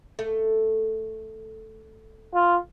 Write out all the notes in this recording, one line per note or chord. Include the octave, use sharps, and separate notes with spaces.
A3
F4